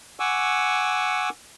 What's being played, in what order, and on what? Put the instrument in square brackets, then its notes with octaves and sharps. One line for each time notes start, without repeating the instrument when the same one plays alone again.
[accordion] F#5 G#5 C#6 D6 E6